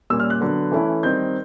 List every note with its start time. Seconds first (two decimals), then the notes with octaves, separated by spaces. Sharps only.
0.10 A#2 G3 A#3 C#4 E6
0.20 F6
0.30 F#6
0.41 D3 F#3 B3
0.72 E3 A3 C#4 E4
1.03 D#3 G3 C4 D#4 G6